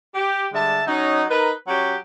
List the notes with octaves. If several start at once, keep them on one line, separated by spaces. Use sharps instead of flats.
G4
D3 G3 G#3 E5 A5
F#3 C#4 D#4
D#4 A#4 B4
F#3 C#4 F#4 G4